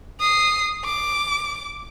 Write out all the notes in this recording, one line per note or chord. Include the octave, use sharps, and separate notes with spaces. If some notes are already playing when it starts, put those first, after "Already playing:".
D#6 C7
D6